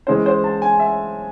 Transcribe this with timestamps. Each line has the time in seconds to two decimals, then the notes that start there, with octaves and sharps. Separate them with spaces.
0.07 E3 G#3 C#4 C5
0.26 C5
0.44 A5
0.62 G#5
0.80 E5